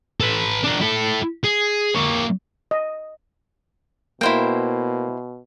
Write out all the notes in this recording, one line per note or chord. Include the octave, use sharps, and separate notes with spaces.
A4 B4
D4 A#4
E4 A4
G#4
A#3 C#5
D#5
B2 A#3 E4 C5 G5